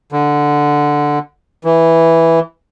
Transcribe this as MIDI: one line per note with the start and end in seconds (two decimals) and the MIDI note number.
0.12 1.19 50
1.65 2.40 52